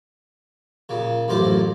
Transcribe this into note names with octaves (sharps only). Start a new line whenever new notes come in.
A#2 C#3
A1 F#2 A2 F4 C5 D6